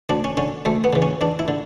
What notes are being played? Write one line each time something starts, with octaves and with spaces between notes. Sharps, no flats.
D2 D4
C#4
D3 C#4
D2 A3
B3
C#3 E3
C#4
E2 D4
E4
D3